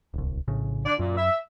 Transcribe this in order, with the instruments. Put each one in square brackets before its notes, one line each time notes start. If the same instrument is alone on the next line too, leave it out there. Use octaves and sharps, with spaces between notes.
[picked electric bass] D1 C2
A#1 A2 C#3
[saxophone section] D3 D4 D5
[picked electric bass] F#2 [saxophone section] A#2
[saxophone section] E5